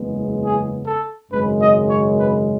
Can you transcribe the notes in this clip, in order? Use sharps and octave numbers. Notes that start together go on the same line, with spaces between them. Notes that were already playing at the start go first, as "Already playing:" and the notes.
Already playing: F#1 E2 C#3 G#3 B3
G#4
A4
G#1 F#2 C#3 G#3 C#4 B4
D#5
C#5
B4